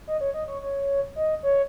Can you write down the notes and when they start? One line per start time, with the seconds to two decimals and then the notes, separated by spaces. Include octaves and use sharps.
0.07 D#5
0.21 C#5
0.34 D#5
0.48 C#5
0.62 C#5
1.16 D#5
1.43 C#5